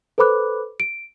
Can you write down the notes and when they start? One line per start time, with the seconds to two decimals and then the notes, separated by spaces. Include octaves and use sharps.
0.18 A4 B4 C5 B5 D6 F#6
0.80 D7